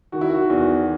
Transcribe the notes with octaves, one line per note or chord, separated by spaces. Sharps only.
D#3 F#4
E4
F#4
E2